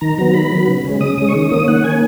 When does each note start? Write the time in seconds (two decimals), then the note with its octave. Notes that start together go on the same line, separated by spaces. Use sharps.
0.01 D#3 A#5
0.18 F#3 B3 A#5
0.34 D#3 B5
0.52 F#3 B3
0.68 C#3
0.85 G#3 C#4
1.01 C#3 D#6
1.18 G#3 C#4 D#6
1.28 C#6
1.34 D#3 D#6
1.50 A#3 C#4 D#6
1.68 D#3 F#5
1.84 A#3 C#4 G#5